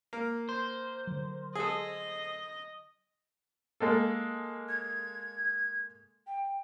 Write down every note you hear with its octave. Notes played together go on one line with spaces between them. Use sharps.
A#3
C5
D3 F#3
G#4 A4 D#5
G#3 A#3 A4
G#6
G5